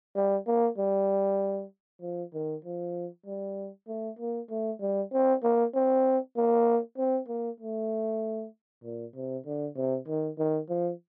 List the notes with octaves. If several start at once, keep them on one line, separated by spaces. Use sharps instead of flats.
G3
A#3
G3
F3
D#3
F3
G3
A3
A#3
A3
G3
C4
A#3
C4
A#3
C4
A#3
A3
A#2
C3
D3
C3
D#3
D#3
F3